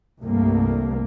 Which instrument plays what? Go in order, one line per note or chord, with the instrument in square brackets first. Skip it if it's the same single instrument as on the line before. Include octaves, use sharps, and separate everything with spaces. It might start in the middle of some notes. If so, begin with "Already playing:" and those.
[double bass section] C2 G2 A3 A#3